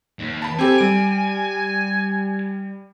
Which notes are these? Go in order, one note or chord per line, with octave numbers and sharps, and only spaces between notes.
D#2
A5 B5
C4 G4 A4 G#5
G3 D7